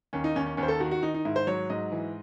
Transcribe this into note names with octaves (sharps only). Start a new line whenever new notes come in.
D#2 C#4
D#4
D#2 C#4
C#4
D#2 C#4
C5
A4
D#3 F#4
F#4
D#3 D#4
D#4
G#2 E4
C5
F#3 C#5
G#2 D#5
E3